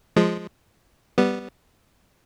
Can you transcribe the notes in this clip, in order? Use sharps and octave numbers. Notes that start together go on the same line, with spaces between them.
F3 G#3
G3 B3